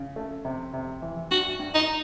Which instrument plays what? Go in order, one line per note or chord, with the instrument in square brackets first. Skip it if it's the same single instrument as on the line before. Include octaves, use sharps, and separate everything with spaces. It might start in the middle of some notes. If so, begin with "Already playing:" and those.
Already playing: [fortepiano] C#3
A3
C3
C3
E3
[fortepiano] G2 [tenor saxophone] F#4
[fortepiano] G2
[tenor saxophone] D#4